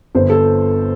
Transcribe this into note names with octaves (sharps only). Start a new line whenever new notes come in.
G1 C5
A4